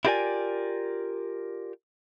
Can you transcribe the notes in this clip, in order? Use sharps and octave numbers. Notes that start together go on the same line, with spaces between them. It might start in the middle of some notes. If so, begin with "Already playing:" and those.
E4 F4 G4 A#4 D5 G#5